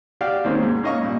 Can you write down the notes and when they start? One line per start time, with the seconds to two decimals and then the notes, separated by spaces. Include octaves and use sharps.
0.21 F#4 G4 D5 F5 G5
0.44 D#2 D#3 G#3 A#3 C4 C#4
0.63 G#2
0.83 A#3 C#4 D#5 F5 C#6
1.02 G2 A#2